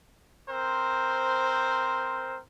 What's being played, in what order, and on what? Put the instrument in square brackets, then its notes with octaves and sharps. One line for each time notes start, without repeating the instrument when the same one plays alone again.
[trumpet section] C4 A#4 C5